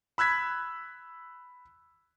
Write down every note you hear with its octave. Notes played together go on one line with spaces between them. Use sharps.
B5 E6 F#6 G#6 B6